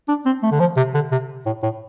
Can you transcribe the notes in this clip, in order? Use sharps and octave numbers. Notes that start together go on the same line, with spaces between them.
D4
C4
A3
D3
F3
C3
D3
C3
A2
A2